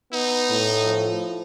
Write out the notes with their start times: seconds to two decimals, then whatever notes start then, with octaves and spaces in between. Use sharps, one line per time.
0.13 B3 D#4
0.50 A2
0.83 F3